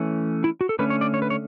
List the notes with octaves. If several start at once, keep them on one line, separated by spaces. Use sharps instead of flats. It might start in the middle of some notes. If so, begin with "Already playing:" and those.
Already playing: E3 A3 C#4
E4
F#4
A4
D3 A3 C#4 B4
C#5
D5
C#5
B4
C#5